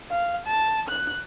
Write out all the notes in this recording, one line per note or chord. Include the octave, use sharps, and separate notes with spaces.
F5
A5
F#6